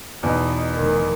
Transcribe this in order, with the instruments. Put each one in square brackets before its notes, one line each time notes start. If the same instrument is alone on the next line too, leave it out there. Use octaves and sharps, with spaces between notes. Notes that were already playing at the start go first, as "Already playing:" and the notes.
[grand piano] E2 B2 [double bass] D#4
[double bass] F1 D#3